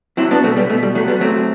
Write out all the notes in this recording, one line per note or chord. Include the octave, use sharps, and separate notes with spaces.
F#3 C4 E4
B3 D4
B2 A3 C4
G3 B3
B2 A3
G3
F#3 A3
G3 B3
F#3 A3 C4